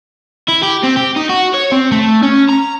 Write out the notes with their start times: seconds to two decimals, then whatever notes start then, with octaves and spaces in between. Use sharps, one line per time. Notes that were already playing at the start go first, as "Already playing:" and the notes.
0.49 E4
0.63 G4
0.84 C4
0.97 G4
1.17 D#4
1.30 F#4
1.54 C#5
1.72 C4
1.92 A3
2.23 C#4
2.49 A#5